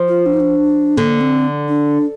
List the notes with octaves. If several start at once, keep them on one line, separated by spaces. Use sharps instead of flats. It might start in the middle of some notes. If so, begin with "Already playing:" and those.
Already playing: F3
F4
D4
D#4
D4
D3 A#3
C4
D4